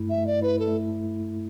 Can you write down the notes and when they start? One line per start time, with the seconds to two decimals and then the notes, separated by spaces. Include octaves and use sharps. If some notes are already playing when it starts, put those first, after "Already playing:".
Already playing: G2 A3 E4
0.10 E5
0.18 A3
0.27 D5
0.42 E4 B4
0.59 A4
0.68 A3